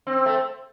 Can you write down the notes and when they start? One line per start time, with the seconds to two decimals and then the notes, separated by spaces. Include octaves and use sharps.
0.07 C4
0.26 A3